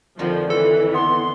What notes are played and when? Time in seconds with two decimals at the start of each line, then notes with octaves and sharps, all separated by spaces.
0.19 F2 D3 D#3 F3
0.50 E3 A4
0.94 B3 C6